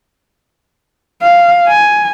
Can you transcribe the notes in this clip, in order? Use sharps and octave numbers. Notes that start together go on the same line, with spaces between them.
F5
G#5